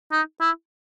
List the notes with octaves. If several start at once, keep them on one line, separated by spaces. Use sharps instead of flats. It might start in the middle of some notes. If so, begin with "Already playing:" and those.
D#4
E4